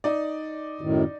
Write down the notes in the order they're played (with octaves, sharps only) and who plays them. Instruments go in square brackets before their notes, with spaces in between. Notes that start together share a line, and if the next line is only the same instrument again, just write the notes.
[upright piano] D#4 D5
[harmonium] F#2 A2 D#3